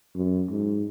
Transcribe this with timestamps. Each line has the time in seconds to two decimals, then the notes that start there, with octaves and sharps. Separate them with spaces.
0.15 F#2
0.50 G#2